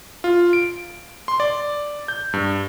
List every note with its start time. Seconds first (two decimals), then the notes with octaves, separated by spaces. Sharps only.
0.24 F4
0.53 D7
1.28 C6
1.40 D5
2.08 G6
2.33 G2